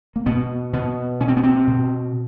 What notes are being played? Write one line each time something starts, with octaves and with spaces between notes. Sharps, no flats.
A#3
B2 B3
B2 B3
B2 C#4
C4
B3
C4
B2